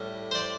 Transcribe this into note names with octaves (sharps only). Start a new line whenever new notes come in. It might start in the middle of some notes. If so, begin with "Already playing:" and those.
Already playing: A2 G3
C5
D5